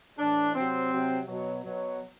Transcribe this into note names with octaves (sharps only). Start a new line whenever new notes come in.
A2 E3 D4
C3 F#3 C4
C3 F#3
B2 F#3
B2 F#3